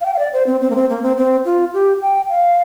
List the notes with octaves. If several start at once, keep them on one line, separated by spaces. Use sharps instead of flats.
F5
G5
F5
D5
C5
C4
C4
A#3
C4
A#3
C4
C4
F4
G4
G5
F5